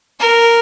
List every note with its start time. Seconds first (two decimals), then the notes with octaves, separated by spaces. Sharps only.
0.20 A#4